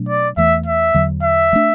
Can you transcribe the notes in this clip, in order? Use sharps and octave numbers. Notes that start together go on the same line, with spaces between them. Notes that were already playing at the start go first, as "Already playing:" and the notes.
Already playing: B2 F#3 A3 D4
D5
E2 E3 A3 E5
E5
E2 D3 F#3
E5
F#3 A3 D4